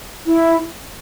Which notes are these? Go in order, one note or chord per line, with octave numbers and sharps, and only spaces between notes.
E4